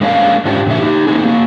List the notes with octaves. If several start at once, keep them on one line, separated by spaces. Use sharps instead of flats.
G#3 A#3 C#4 D4 E4 F5
G#2 C#4 D4 F4 G4
F2 A#2 D3 F#4 E5
D#4 G4
A#3 C4 D#4 G#4
A#3 F#4